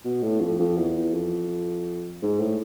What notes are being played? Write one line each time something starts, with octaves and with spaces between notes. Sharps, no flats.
B2
A2
F2
F2
E2
F2
G#2
A2